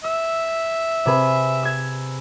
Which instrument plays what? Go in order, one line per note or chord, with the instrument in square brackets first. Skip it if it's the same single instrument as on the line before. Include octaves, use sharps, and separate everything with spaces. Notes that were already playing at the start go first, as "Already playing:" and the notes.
[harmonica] E5 [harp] E6
[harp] C3 G#4 B4
E6 G#6